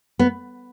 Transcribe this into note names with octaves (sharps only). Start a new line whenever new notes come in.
B3